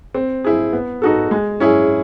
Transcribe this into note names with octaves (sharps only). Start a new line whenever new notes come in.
C4
E4 G#4
B3
D#4 F#4 A4
G#3
C#4 E4 G#4